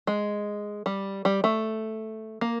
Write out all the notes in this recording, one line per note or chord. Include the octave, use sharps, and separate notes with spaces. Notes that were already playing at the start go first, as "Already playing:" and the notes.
G#3
G3
G3
A3
A#3